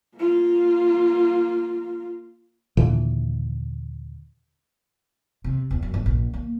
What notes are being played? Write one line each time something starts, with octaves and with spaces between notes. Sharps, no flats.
A#3 F4
D#2 A#2 D3 E3
C3
E2
F#2
G1
A#1
A#3